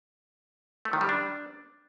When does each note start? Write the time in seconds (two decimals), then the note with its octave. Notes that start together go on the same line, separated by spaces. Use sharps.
0.85 A3
0.93 D#3
1.01 G3
1.09 D4